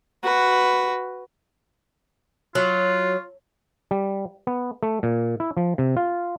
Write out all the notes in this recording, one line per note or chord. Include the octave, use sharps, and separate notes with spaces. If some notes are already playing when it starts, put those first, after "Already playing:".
F#4 B4
F#3 F4
G3
B3
A3
A#2
E4
F3
C3
F4